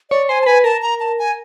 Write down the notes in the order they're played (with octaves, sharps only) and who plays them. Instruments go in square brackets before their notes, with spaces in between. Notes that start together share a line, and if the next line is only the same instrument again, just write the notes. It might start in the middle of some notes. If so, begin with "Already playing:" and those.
[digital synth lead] C#5 [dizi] D5
[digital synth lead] C5 [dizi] G#5
[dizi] A5
[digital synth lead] B4 [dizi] G#5
[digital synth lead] A#4 [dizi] A5
[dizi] A#5
A5
G#5